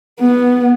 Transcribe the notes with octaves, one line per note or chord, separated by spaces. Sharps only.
B3